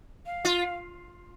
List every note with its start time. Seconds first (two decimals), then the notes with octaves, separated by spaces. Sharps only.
0.26 F5
0.45 F4